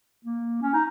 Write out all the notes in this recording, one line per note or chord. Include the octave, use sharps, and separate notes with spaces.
A#3
C#4
D#4